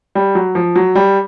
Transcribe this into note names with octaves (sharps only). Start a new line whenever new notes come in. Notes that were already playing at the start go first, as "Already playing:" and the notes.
G3
F#3
F3
F#3
G3